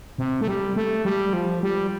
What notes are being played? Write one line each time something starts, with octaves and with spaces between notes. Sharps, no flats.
C3
A3
G3
A3
G3
F3
G3